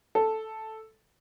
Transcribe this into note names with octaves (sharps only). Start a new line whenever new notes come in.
A4